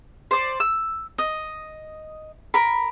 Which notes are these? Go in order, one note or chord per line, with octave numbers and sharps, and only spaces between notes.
C5 D5
E6
D#5
A#4 B5